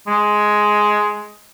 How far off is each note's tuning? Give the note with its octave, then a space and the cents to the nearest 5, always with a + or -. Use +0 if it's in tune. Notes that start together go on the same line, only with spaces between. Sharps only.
G#3 +10